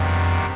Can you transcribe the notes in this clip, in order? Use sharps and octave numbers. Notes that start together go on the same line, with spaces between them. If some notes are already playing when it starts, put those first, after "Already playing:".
Already playing: F2 C3 D#3 G3 B3 D4